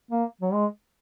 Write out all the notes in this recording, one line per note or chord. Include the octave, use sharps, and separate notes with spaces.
A#3
F#3
G#3